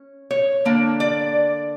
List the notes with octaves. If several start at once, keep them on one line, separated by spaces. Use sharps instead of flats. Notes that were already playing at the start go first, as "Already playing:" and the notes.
Already playing: C#4
C#5
D3 A#3 D4
D5